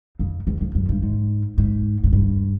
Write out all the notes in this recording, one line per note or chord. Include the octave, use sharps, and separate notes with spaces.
F2
E2
F2
F#2
G2
G#2
G#2
G#2
G2